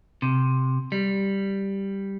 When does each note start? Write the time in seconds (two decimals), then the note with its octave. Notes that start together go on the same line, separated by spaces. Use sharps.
0.22 C3
0.92 G3